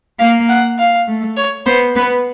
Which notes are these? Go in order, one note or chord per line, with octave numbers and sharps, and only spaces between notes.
A#3 F5
F#5
F5
A3
C#5
B3 C5
B3 B4